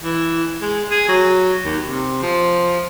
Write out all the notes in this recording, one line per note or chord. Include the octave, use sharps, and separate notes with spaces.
E3
G#3
G#4
F#3
D#2
C3
F3